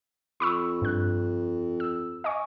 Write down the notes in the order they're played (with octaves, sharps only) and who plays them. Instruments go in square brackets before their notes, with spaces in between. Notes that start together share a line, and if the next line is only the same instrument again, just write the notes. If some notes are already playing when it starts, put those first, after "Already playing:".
[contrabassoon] F2 [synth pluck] B5 C#6 E6
[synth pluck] G2 F#6
E6
D#5 G#5 C#6